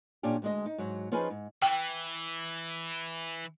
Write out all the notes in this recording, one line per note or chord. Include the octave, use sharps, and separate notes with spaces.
A#2 C#4 D4 G4
D2 G#3 D#5
D#4
G#2 F#3
F3 C#4 D#4 F4 G#4 B4
G#2
E3 G5